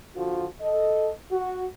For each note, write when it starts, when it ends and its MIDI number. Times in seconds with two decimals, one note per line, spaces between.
0.15 0.46 50
0.15 0.46 53
0.15 0.46 65
0.15 0.46 66
0.61 1.09 69
0.61 1.09 75
1.31 1.64 66